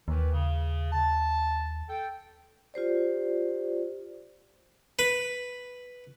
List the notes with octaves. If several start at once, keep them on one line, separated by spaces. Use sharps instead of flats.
D#2 D#3 E3
C#3
A5
A4 G5
F4 G4 C5 D5
B4